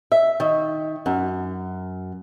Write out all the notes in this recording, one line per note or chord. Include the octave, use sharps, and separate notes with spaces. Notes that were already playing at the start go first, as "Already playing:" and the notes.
E5
D#3
F#2